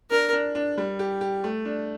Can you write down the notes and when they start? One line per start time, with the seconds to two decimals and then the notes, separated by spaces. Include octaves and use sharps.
0.10 D4 A#4
0.33 D4
0.55 D4
0.78 G3
0.99 G4
1.21 G4
1.44 A3
1.65 D4